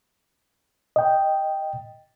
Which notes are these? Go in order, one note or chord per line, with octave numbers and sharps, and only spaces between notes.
D#5 G5